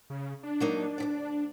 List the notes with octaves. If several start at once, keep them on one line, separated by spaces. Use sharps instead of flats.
C#3
D4
F#3 A#3 D#4
D2 B2 D5